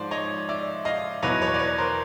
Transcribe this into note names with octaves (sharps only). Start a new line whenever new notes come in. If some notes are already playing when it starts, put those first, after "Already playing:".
Already playing: G#2 F3 C5 D5
C#5 D#5
D5 E5
D#5 F5
E2 B2 F#3 B4 C#5
B4 C#5
D5
B4 C#5
A#4 C5